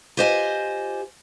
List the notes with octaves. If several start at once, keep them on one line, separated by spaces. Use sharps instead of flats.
F4 G4 C5 D#5 G#5